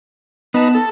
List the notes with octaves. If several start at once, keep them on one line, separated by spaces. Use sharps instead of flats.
B3 D#4 B4 A5
A4